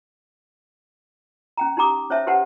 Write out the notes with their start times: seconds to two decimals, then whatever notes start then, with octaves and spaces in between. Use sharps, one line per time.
1.57 C#4 G5 A#5
1.77 D#4 G4 A#5 D6 D#6
2.10 C#4 C5 C#5 E5 A5
2.27 G4 B4 C5 F#5 A5